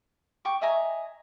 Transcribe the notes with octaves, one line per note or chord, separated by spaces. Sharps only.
G5 C#6 D6
D#5 E5 G#5 A#5